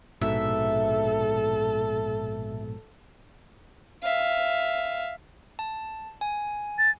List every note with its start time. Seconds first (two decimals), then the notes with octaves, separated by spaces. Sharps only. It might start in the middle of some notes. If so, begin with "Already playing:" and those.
0.21 A#1 G#2 B2 A4 E5
4.02 E5 F5
5.59 A5
6.21 G#5
6.78 A6